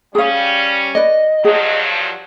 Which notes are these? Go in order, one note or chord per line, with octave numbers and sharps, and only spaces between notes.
G3 C#4 G#4 F5
B4 D5 D#5
G2 F3 F#3 G#4